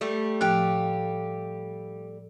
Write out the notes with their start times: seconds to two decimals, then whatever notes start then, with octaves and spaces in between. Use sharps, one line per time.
0.01 G3 A3
0.41 A2 F3 G4 F5 F#6